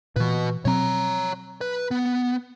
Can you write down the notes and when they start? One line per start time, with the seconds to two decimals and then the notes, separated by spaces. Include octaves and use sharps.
0.16 A#2 E3 F#4 B4
0.65 B2 F#3 C4 C#5 A#5
1.61 B4
1.91 B3